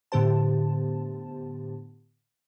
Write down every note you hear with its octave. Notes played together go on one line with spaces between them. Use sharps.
A2 D3 B3 G4 C5 A5